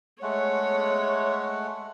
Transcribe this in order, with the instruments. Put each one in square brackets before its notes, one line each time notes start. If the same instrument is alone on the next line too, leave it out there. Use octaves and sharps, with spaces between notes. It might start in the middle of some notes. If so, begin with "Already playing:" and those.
[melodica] G#3 A3 F#5 [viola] C#5